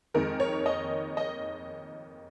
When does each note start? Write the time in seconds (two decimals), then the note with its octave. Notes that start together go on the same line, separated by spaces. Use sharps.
0.14 F2 D#3 G#3 A#4
0.40 C#5
0.66 D#5
1.17 D#5